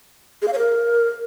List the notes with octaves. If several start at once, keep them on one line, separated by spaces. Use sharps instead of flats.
G#4
F5
C#5
A#4